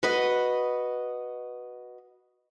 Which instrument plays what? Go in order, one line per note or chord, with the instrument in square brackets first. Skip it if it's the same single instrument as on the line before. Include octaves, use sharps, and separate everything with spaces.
[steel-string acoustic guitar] F#4 B4 D#5